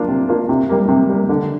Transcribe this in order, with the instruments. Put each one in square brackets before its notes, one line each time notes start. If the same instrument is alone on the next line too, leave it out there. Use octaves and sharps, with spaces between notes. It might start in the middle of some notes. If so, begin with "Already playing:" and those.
Already playing: [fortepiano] A#3 D4 F4
C3
A#3 D4 F4
C3
G3 A#3
C3
G3 A#3
D3